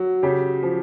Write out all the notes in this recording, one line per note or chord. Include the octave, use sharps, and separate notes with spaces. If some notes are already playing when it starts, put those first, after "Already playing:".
Already playing: F#3
C#3 G4
F3